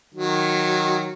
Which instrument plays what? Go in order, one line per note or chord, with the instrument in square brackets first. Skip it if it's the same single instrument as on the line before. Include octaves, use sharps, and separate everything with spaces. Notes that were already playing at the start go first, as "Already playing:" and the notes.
[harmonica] D#3 F#3